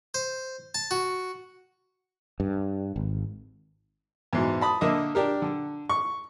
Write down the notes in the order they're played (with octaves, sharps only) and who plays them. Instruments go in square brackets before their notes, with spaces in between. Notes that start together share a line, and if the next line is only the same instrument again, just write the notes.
[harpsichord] C5
A5
F#4
[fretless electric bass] G2
G#1
[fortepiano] E2 G#2 B2
A5 B5 D#6
D3 A#3 D#5 E5 D#6
D4 G4 A#4
D3
C#6